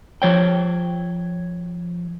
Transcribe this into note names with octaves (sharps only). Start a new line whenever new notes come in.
F3 C#5 G5